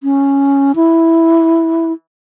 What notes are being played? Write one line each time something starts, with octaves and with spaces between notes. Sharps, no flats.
C#4
E4